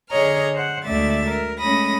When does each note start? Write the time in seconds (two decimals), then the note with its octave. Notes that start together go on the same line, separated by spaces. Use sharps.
0.10 D3 G#4 C#5 D#5 A#5 F6
0.54 C5 F#5
0.86 D2 G#3 A3 D5 E5 A6
1.28 A#4
1.60 G#3 A3 C#4 B5 D#6 A#6